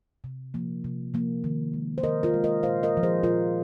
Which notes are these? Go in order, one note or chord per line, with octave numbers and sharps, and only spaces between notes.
C3
F3 A#3
C3
F3 A#3
D#3
G#3
C5
D#3 A#4 D#5
F4 A#4
G#3
A#4 D#5
A#2 C5 F5
A#4 D#5
F3 A#3
G#4 C5
A#2 F4 A#4